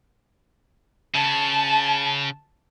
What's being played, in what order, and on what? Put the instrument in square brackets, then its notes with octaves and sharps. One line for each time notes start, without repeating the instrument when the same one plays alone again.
[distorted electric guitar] C#3 [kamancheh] A5